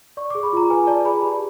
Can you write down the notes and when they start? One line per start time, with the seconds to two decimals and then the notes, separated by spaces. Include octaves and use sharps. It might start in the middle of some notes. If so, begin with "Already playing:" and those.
0.17 D5 C#6
0.30 G#4 D6
0.43 B5
0.53 F4 A#5
0.70 B4 G#5
0.87 D5 A5
1.05 G#4 B5
1.23 G4 B5